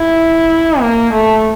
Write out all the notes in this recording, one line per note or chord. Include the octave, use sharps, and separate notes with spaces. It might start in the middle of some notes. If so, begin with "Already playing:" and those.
Already playing: E4
A#3
A3